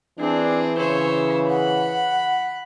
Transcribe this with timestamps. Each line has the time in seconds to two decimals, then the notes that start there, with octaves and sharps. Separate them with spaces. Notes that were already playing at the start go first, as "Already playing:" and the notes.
0.19 E3 C4 D4 G#4
0.79 C#3 C5 C#5 E5
1.50 F#5 B5 F#6